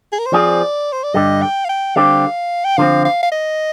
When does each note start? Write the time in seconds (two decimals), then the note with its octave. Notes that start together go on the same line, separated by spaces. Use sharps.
0.12 G#4
0.19 A#4
0.26 C5
0.33 F3 C4 F4 G#4 D5
0.92 C5
1.03 D5
1.14 G2 D3 G3 D#5
1.42 G5
1.65 F5
1.69 G5
1.96 D3 G3 C4 G4 F5
2.64 G5
2.77 D3 F3 C4 F5
3.05 F5
3.23 F5
3.32 D#5